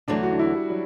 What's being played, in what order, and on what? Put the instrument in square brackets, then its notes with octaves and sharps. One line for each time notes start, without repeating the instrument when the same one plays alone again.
[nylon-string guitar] E2 D3 F#3 A3 [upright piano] D4
[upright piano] F#4
D4
E4
G3
F#3